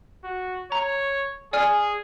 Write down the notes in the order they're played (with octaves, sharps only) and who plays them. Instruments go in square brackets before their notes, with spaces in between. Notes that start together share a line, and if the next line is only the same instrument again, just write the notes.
[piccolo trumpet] F#4
[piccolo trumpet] C#5 [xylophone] A#5
[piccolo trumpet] G#4 [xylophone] D5 G#5 F6